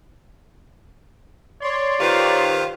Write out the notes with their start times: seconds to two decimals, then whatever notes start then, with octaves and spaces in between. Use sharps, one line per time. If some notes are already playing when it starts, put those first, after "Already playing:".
1.61 C#5 D5 C6
2.00 D#3 F4 G4 B4 C5